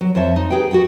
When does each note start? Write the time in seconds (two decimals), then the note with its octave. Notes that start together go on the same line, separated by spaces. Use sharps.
0.01 F#3
0.15 F2 C5 C#5 E5 A5
0.36 D#4
0.50 G4 G#4 B4 G5
0.71 F#4 G4 F#5 G5